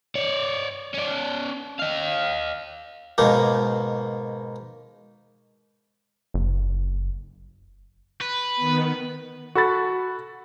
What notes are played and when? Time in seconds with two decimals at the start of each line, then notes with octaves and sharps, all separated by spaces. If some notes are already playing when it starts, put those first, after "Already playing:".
0.15 C#5 D5
0.94 C#4 D5
1.79 D#5 F5
3.18 G#2 B2 A#3
6.34 F#1
8.21 B4
8.56 D#3 B3
9.55 F#4 A4 B5 A6